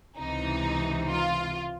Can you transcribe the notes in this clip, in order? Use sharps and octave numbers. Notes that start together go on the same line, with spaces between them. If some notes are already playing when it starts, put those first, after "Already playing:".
C#2 C3 E3 D#4
F4